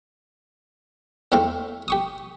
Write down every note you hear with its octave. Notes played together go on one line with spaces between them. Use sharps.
E2 A3 C4 F5
G4 C#6 D#6